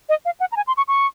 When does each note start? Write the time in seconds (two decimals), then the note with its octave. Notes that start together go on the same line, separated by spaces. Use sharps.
0.09 D#5
0.25 F5
0.40 F#5
0.52 A#5
0.56 G#5
0.67 C6
0.77 C#6
0.88 C#6